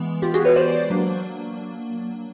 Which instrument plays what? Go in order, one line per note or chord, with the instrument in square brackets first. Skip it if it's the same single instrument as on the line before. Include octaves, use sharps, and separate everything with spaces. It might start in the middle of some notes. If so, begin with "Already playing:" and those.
Already playing: [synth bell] E3 G#3 B3
F4 G4
F#4 G#4
B4 C#5
C5 D5
F#3 A#3 D4